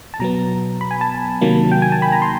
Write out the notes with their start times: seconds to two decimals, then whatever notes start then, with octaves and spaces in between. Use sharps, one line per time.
0.14 A5
0.20 B2 F#3 B3 A#5
0.81 B5
0.91 G#5
1.01 A5
1.41 C3 D#3 F#3 A#3
1.72 G5
1.82 G#5
1.92 A5
2.02 B5
2.12 A#5
2.22 C6